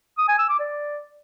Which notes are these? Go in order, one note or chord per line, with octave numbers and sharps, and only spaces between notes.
D#6
G#5
E6
D6
D5